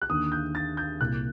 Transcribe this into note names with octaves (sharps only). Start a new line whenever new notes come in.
F#6
D#2 D3 D#6
G6
A6
G6
C2 A#2 F#6